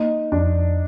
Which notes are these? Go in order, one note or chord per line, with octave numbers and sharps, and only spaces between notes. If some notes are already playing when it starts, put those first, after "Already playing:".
Already playing: A#3 D#4
F2 D4